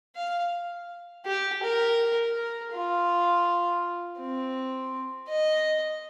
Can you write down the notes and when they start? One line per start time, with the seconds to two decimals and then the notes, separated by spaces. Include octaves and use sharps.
0.16 F5
1.26 G4
1.63 A#4
2.36 A#4
2.72 F4
4.19 C4
5.29 D#5